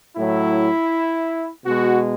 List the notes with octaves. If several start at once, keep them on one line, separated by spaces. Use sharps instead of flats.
A2 F#3 E4
B2 G#3 F#4